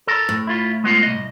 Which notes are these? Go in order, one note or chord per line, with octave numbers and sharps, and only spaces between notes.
A4 A#4
A2
E4 F4
G#3 B3 F4
C2 D#5